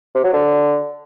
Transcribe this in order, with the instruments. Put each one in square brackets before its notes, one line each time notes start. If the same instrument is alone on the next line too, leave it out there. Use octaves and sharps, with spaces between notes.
[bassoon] C3
F#3
D3